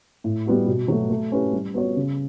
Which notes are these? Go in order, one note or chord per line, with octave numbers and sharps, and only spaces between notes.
A2
G3 B3 F#4
B2
F#3 A3
A3
C#4 E4 G4 B4
G3
B3 F#4 C#5
C#3